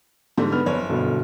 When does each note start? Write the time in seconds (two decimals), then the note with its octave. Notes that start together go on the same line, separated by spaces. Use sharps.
0.37 G#2 D3 G3
0.52 B3 F6
0.66 F#1 C#5
0.89 G1 B2 A4